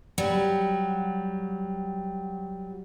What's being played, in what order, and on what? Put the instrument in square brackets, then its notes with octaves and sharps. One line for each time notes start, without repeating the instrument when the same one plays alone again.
[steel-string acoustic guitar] F#3 G3